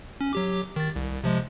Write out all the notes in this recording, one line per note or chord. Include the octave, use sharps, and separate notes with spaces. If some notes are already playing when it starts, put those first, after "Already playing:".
C#4
F#3 G4 D6
D#3 A6
C2
C3 F3 G#3